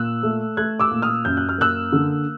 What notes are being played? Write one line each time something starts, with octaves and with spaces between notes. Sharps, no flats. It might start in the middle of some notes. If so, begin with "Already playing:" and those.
Already playing: A#2 E6 F#6
A3
A3 F#6 G#6
D6 E6
A#2
D#6 F6
F#2 G6
F#6
F6
A#3 E6 F#6
D3